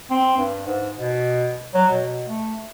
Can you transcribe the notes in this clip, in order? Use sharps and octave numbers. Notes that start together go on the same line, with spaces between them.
C4
G2
G#2
B2
F#3
B2
A3